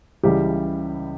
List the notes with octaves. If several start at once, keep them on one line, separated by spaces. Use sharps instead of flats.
C#2 C#3 E3 G3 G4